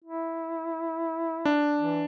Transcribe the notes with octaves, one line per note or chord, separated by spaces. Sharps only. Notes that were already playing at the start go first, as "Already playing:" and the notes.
E4
D4
E3